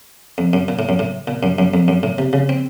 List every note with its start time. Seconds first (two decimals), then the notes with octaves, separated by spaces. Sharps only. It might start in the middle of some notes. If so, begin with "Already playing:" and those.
0.38 F2
0.53 F#2
0.68 A#2
0.79 A2
0.89 F#2
0.99 A2
1.28 A#2
1.43 F#2
1.58 F#2
1.74 F2
1.88 F#2
2.03 A2
2.18 C3
2.33 C#3
2.49 C4